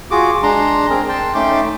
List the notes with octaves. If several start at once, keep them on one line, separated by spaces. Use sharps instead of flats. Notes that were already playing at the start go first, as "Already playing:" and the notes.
F4 F#4 G#4 D6
G#3 D4 A#5 C6
C4 G#4 A#4
G5 A5 C6
A3 C#4 D#4 G5 C6 D6